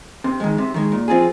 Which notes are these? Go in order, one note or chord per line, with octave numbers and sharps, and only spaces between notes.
C3
D#3 G#3
C3
D#3 G#3
A#2
F3 C4 F4 G#4